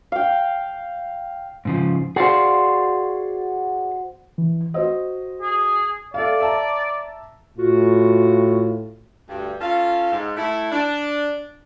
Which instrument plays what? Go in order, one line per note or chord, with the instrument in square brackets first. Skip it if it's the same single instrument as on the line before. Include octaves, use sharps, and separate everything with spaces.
[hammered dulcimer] F5 G5
[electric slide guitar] G#2 C#3 F3
[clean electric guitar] F#4 C5 [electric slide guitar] G#4 D5 F5
[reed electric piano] E3
[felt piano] F#4 C5 D#5
[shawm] G#4
[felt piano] A4 E5 F5 [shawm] D5
[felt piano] E5 A5 A#5
[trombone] A2 [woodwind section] F4 F#4
[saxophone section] D2 G2
C#4 F4 A4 F5
G#2
A3 E4
D4